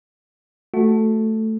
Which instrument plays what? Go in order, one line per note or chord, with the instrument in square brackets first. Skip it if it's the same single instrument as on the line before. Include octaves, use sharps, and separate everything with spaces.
[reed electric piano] A3 [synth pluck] F#4